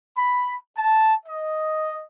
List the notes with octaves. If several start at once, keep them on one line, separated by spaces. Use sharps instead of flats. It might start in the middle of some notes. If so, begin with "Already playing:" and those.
B5
A5
D#5